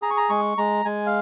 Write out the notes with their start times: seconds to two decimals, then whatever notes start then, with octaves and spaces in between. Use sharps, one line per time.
0.02 G#4 A#5
0.10 C#6
0.17 A#5
0.30 G#3 C#6
0.58 G#3 A#5
0.85 G#3 G#5
1.06 F5